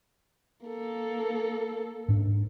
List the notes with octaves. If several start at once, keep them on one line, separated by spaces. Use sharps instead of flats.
A#3 A4
G#2 D4